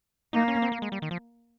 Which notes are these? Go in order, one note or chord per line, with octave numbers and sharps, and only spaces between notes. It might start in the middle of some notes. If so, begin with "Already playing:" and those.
A#3 D#4
C#4
C4
A#3
G#3
G3
D#3
F3